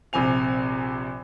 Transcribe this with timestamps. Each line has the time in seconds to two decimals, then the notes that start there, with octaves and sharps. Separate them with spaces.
0.13 A#1 C3 C4 G#5 F7